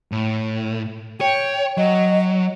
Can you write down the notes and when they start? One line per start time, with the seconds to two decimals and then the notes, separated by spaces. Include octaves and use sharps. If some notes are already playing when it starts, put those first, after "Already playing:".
0.12 A2
1.21 C#5 G5
1.78 F#3 D#5